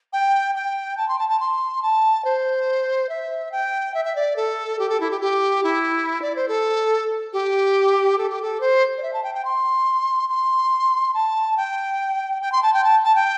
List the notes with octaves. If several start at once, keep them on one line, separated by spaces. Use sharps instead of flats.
G5
G5
A5
C6
A5
A5
C6
A5
C5
E5
G5
E5
E5
D5
A4
G4
A4
E4
G4
G4
E4
D5
C5
A4
G4
A4
G4
A4
C5
D5
E5
A5
G5
G5
C6
C6
A5
G5
G5
C6
A5
G5
A5
A5
G5